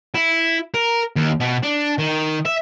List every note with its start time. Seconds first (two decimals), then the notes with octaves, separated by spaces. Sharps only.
0.15 E4
0.74 A#4
1.16 D#2
1.40 B2
1.63 D4
1.98 D#3
2.46 E5